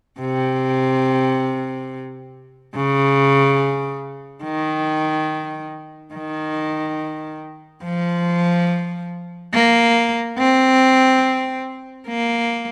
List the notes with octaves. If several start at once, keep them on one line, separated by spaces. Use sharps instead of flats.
C3
C#3
D#3
D#3
F3
A#3
C4
A#3